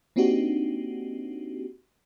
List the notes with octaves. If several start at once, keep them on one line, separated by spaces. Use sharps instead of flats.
A#3 C4 D4 D#4 F#4 G4